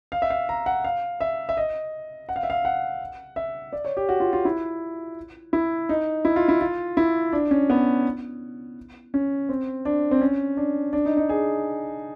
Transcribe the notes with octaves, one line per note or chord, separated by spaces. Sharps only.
F5
E5
F5
A#5
F#5
F5
E5
E5
D#5
F#5
F5
E5
F5
F#5
E5
D5
C#5
G4
F#4
F4
F4
E4
E4
D#4
E4
F4
E4
F4
E4
D4
C#4
B3
C#4
C4
D4
C4
C#4
D4
D4
D#4
D#4
G#4